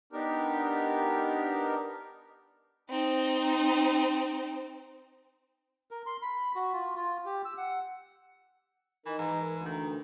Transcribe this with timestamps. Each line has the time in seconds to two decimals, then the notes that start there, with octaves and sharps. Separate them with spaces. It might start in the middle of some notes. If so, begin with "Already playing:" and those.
0.13 B3 D4 D#4 G4 A#4
2.89 C4 D#4
5.91 A#4
6.06 C6
6.22 B5
6.56 F#4
6.73 F4
6.96 F4
7.26 G4
7.45 E6
7.57 F#5
9.06 E3 D#4 A#4
9.19 G#2 E3
9.53 D2
9.66 D#3